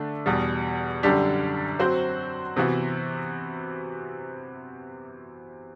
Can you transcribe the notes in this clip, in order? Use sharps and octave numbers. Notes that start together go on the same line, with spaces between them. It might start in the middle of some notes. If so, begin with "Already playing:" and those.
Already playing: D3 A3 D4
E2 B2 G3
F#2 D3 G3 D4 G4
F#3 C4 F#4 C5
C3 E3 B3 F#4